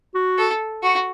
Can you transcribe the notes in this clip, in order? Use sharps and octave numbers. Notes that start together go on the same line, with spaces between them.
F#4
A4
F#4